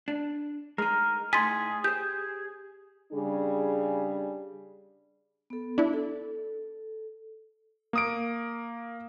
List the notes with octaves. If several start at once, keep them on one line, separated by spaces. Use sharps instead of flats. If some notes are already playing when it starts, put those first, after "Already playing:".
D4
G#3 D#4 A#4
A2 D#4 G#4 G#5 C6 A6 B6
G4 C5 G6
C#3 G3 D4 G#4
B3 A4
D4 E4
A4
A#3 D#6 D7